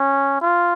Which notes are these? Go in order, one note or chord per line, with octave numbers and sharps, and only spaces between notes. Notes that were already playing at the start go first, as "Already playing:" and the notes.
Already playing: C#4
F4